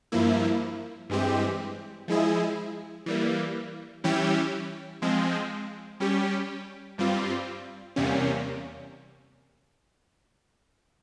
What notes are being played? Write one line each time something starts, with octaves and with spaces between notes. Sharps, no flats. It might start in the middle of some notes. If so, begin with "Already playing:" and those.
G2 F3 A#3 E4
G2 E3 G#3 C4 G4
F3 G#3 E4 G#4
E3 G3 A#3
E3 G3 C#4 E4 G4
F3 G#3 C4
G3 C#4 G4
G2 G3 C4 F4
E2 C3 G3 A#3 C#4